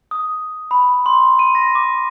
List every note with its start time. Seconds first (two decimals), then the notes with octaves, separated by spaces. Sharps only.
0.11 D#6
0.71 B5
1.06 C6
1.39 D#7
1.55 A#6
1.75 D6